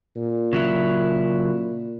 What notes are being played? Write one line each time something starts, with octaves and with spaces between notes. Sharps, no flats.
A#2
C#3 F#3 E4